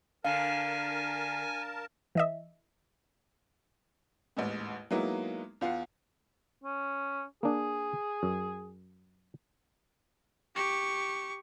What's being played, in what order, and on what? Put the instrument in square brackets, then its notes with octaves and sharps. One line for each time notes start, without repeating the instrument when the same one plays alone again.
[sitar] D3 [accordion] A#4 A5 [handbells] F5 [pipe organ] G#5
[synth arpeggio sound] E3 D#5 E5
[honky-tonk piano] A1 D#2 G#2
F#3 G#3 A#3 B3 D#4 E4
E2 F4 F#5 C7
[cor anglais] C#4
[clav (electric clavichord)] A#3 D4 [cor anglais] G#4
[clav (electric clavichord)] F#2
[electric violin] G4 C#6